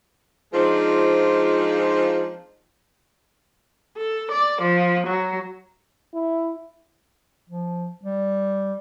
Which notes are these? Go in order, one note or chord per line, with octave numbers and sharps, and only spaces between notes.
F3 G#3 C4 D4 D#4 F4
A4
D5
F3
F#3
E4
F3
G3